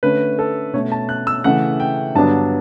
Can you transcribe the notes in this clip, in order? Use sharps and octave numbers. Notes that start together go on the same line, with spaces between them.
D3 A3 C#4 B4
A4
B2 A3 C#4 C#5
A5
F#6
E6
C#3 E3 A3 F#5
G5
G2 D3 F#3 B3 D4 A5